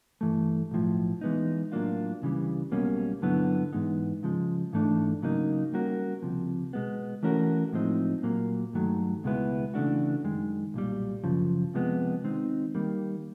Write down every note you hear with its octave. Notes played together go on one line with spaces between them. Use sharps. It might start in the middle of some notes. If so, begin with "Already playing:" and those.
G2 E3 A3
B1 A2 F3
E3 G#3 B3 D#4
A2 F#3 A#3 D4 F4
C#2 C#3 E3 G3
B1 B2 G3 A#3 C#4
G2 D3 F#3 B3 E4
G#2 E3 G#3 B3 D#4
C#3 F3 G#3
G#2 E3 A3 D4
C#3 F#3 A#3 D#4
G3 A#3 C#4 F#4 A#4
C#2 C3 F3
B2 G#3 B3
E3 A3 C#4 F#4 A#4
A2 F3 G#3 C4 D#4
A#2 F#3 A#3
G2 D#3 F#3 A3
C#2 B2 G#3 B3 E4
C#3 E3 A3 D4 F#4
F#2 D#3 G#3
B1 A#2 G3
F#2 C#3 F3
C3 F3 G#3 B3
D#3 G#3 C4 D#4
D#3 G3 A#3